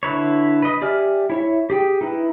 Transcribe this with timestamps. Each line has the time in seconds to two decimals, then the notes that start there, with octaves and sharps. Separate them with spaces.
0.03 D3 E4 B4 C#5
0.62 B4 D#5
0.82 G4 D5 E5 G#5 F6
1.30 E4 C#5 E5
1.70 G4 G#4 G5
2.01 D#4 E4 B4